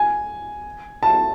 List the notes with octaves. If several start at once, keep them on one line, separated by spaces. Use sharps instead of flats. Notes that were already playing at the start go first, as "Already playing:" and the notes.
Already playing: G#5
A5